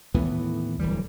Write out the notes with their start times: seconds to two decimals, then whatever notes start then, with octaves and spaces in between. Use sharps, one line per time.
0.14 D#2 A2 E3 B3
0.79 D1 E3 G3